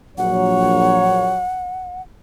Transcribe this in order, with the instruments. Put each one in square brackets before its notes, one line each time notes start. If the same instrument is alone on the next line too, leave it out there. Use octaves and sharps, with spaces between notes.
[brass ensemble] A#1 F#3 C#5 [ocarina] F#5